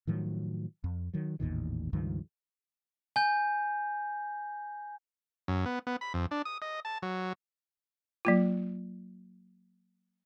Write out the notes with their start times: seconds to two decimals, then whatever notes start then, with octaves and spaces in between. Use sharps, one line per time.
0.07 A2 D#3 F3 F#3
0.84 F2
1.14 D#3 F#3
1.40 A1 E2 A#2 D#3
1.93 C#2 G2 D#3 F3
3.16 G#5 G6
5.48 F#2
5.66 B3
5.87 B3
6.01 B5
6.14 F2
6.31 D4
6.45 D#6
6.62 D#5
6.85 A5
7.03 F#3
8.25 F#3 A#3 F4